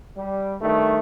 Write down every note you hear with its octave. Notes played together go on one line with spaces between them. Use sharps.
G3
G2 D#3 A3